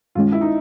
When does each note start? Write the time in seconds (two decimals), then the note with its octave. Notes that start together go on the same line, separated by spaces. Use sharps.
0.15 G2 D#3 G#3 C#4 F4
0.32 E4
0.41 D#4